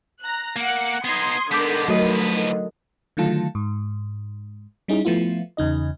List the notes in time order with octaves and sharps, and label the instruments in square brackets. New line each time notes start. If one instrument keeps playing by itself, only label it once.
[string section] A#5 F#6
[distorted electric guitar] A#3 [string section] F#5 C#7
[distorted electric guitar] B3 D#4 [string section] C6 D#6 G#6
[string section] D3 D#3 [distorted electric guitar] G#3 B3 [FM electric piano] D6 G6 B6
[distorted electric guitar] F3 B4 [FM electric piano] F#3 A3 D#5
[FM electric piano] D3 D#3 F#3 A3 F4 A5
G#2
G3 C#4 D#4 E4 G#4
F3 A3 B3 E4 F4
E2 C#3 D#4 D#5